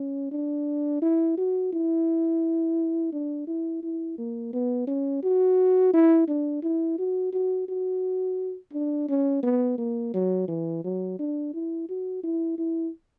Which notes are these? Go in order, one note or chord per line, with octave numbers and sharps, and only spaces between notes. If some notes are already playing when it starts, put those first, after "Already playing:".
Already playing: C#4
D4
E4
F#4
E4
D4
E4
E4
A#3
B3
C#4
F#4
E4
D4
E4
F#4
F#4
F#4
D4
C#4
B3
A#3
F#3
E3
F#3
D4
E4
F#4
E4
E4